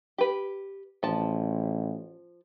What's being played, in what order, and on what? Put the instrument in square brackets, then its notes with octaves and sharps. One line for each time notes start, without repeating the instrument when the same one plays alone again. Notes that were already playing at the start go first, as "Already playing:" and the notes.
[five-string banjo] G4 B4
[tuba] A1 [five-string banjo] F3 A5